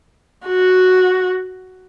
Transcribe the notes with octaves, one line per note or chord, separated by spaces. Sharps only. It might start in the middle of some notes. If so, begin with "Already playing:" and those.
F#4